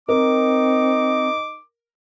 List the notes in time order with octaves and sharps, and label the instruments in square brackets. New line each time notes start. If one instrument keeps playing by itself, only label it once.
[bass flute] C4 [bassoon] D#4 [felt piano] A#4 [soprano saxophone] D6